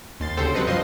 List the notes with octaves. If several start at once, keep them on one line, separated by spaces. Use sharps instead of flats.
D#2 C6 A6
D2 C#3 G4 A4 C5
F#3 C4 B4 D#5 C#7
G2 F3 D#5 C6